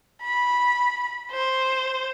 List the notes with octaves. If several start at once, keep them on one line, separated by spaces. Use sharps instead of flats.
B5
C5